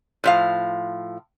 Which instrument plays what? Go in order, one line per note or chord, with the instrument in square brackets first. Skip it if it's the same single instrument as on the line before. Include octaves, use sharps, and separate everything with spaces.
[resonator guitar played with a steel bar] A2 F3 F5